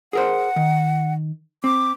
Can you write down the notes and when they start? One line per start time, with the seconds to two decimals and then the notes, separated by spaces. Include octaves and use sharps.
0.13 G#4 A#4 C5 F#5
0.56 D#3
1.64 C4 D6